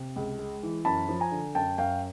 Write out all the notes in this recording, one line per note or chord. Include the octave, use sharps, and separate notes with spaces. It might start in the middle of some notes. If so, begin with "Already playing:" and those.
Already playing: C3
C#2
G#3
E3
F#2 A5 B5
F3
G#5 A#5
D3
F#2 G5 A5
F#2 F5 G5